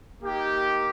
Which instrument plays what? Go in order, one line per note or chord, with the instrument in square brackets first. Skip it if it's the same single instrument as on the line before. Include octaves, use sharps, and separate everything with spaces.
[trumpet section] A#3 D#4 G4